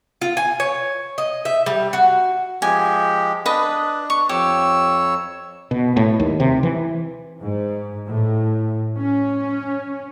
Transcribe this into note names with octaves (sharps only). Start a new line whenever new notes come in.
F4
G#5
C#5
D#5
E5
G3
F#4
F3 G#3 G4 G#5
D4 B4 D#5 D#6
C#6
F2 G4 C#5 E6
B2
A2
D#2
C3
E3
G#2
A2
C#4